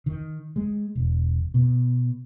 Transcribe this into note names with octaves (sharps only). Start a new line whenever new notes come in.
D#3
G#3
E1
B2